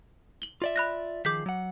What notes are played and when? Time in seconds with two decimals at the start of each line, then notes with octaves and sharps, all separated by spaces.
0.42 F#7 G7
0.62 F4 D5 E5
0.76 B5 F#6 A#6
1.25 D#3 F3 G#4 D6 G6 B6
1.46 F#3 F#5